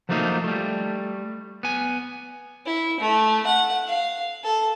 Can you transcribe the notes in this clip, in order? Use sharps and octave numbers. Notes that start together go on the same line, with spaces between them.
F3 F#3 A3 A#3 D#4 F4
G3 A3
B3 G#5
E4
A3
F#5
F5
A4